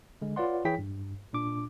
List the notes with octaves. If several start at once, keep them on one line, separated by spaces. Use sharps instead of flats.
D3 G#3
F4 B4 C#5 D5 F#5 C6
E3 E4 G#4 C#5 G5 B6
G2
A#2 D4 D6